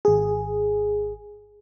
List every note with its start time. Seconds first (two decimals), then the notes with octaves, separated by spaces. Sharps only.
0.05 G#1 G#4